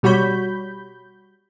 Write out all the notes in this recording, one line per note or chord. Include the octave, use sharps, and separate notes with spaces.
B2 G3 F#4 C#5 B5 G6